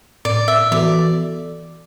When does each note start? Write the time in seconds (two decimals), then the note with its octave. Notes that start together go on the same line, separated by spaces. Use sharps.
0.25 A2 D5
0.48 E5
0.71 E3 B3 F#4 A4 D5